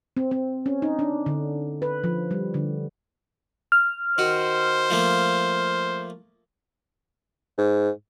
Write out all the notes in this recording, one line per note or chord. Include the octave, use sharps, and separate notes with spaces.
C4
C4
C#4
D#4
D4
D3
B4
F3
G3
D3
F6
D#3 F#4 C5
F3 A3 A#3
G#2